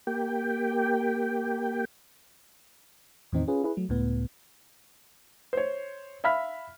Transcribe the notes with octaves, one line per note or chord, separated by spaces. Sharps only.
A#3 G4 G5
E2 A2 D#3 C4 D#4
C#4 F4 G#4 B4
E4 G#4 B4
F#3 A3
C#2 A2 B3
C5 C#5
E5 F5 B5 F6 B6